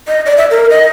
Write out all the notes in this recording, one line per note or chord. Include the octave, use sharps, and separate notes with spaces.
D#5
D5
E5
A#4
D#5